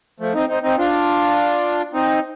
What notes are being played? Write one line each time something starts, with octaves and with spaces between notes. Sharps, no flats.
F3 A3
C4 D#4
C4 D#4
C4 D#4
D4 F4
C4 D#4